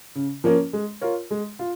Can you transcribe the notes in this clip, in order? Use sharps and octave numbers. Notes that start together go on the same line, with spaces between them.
C#3
F3 A#3 C#4 A#4
G#3
F4 A#4 C#5
G#3
F4